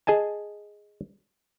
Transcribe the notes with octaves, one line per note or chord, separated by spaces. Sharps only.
G#4 D#5 G#5 A5